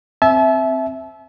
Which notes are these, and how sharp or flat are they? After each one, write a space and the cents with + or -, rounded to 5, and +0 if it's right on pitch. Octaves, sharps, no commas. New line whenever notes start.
C4 +0 E5 -5 A5 -40